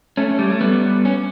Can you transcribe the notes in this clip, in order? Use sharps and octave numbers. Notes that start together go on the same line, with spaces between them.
A3 C#4
G3
A3
G3 B3
C#4